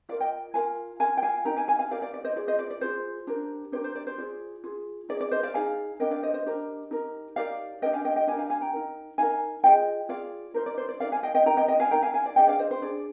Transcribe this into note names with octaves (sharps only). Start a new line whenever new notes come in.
F4 A#4 D5 F5
D#5 G5
F4 A#4 F5 G#5
F4 A#4 F5 G#5
G5
F5 G#5
D#4 G4 A#4 G5 A#5
F5 G#5
F5 G#5
F5 G#5
D#4 G4 A#4 D5 F5
D5 F5
D5
C5 D#5
F4 G#4 D5
C5 D#5
D5
D5
F4 G#4 C5
D4 G4 A#4
D4 G4 A#4 C5
C5
D5
C5
F4 G#4 D5
F4 G#4
D#4 G#4 D5
D5
C5 D#5
D5 F5
D#4 G#4 F5 G#5
D4 G4 A#4 D#5 G5
D5 F5
C5 D#5
C5 D#5
D4 G4 A#4
D#4 G4 A#4
D#4 G4 A#4 D5 F5
D4 G4 A#4 D#5 G5
F5 G#5
D#5 G5
D#5 G5
D4 G4 A#4 F5 G#5
F5 G#5
F5 G#5
G5 A#5
D#4 A#4
D#4 A#4 F5 G#5
F4 G#4 D#5 G5
F4 G#4 D5 F5
D#4 G4 A#4 C5
D5
C5
D5
D#4 G4 A#4 D5 F5
F5 G#5
D#5 G5
D#5 G5
D#4 A#4 G5 A#5
D#5 G5
D#5 G5
F5 G#5
D#4 A#4 G5 A#5
F5 G#5
F5 G#5
D5
D4 G#4 D#5 G5
D5 F5
C5 D#5
C5
D4 G#4 D5